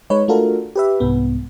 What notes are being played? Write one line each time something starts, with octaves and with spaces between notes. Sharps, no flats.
G#3 D#4 B4 C#5
A3 D4 F4 F#4 A4 A#4
G4 B4 E5
C2 G#2 B3